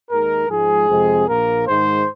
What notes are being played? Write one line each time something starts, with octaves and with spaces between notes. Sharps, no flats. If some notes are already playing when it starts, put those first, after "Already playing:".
D#2 D#3 G#3 A#4
G#2 F3 G#3 G#4
F2 C3 G#3 C4
A#1 A#2 A#3 A#4
G#2 D#3 G#3 C5